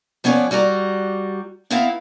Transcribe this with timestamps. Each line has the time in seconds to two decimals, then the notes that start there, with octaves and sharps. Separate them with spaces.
0.24 F3 B3 C#4 C#5 D5
0.51 G3 F#4 D5 A#5
1.70 B3 C4 E4 E5 F5 A#5